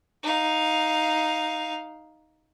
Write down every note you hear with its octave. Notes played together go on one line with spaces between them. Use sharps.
D#4 F5